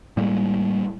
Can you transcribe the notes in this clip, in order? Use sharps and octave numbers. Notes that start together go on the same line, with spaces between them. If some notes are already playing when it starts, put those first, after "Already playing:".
A2 G3 G#3 A#3